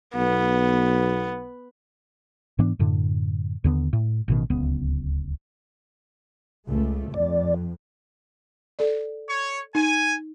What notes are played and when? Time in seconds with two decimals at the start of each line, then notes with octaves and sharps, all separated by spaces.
0.15 B1 B3
2.59 G#2 E3 B3 D4
2.79 F#2 A2 D3
3.64 D#2 D3 B3
3.93 A2
4.28 A1 B2 D#3
4.50 D1 C#2 B3
6.67 C#2 A3
7.14 F2 D5
8.79 A4 D5
9.29 C#5
9.75 D#4 G#5